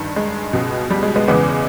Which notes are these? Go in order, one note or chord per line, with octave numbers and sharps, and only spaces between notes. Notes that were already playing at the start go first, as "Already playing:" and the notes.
Already playing: G2 D#3
G#3
C#2 B2
G3
G#3
G#3 B3
E2 C#3 E3 G#3 B3